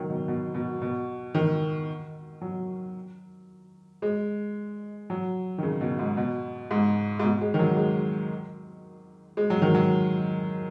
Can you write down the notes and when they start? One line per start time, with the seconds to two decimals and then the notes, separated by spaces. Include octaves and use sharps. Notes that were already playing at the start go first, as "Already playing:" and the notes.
Already playing: D#3 F#3
0.10 B2
0.28 B2
0.54 B2
0.81 B2
1.34 D#3
2.41 F#3
4.02 G#3
5.10 F#3
5.58 D#3
5.63 C#3
5.81 B2
5.99 G#2
6.17 B2
6.71 G#2
7.19 G#2
7.23 B2
7.41 G#3
7.54 D#3
7.59 F#3
7.77 G#3
9.37 G#3
9.50 F#3
9.62 D#3
9.74 F#3